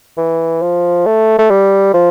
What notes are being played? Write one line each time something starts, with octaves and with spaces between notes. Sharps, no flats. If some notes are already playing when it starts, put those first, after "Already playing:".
E3
F3
A3
A3
G3
F3